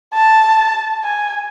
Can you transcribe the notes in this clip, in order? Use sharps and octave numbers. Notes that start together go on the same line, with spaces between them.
A5
G#5